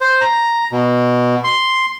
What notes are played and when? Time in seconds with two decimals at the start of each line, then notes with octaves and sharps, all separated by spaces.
0.01 C5
0.21 A#5
0.72 B2
1.44 C6